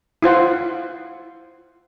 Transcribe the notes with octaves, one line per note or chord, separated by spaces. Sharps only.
E4 F4 C5 F#5